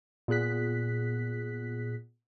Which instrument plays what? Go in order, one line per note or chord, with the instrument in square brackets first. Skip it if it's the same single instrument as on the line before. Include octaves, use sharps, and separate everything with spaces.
[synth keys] A#2 B3 G#4 F#6 B6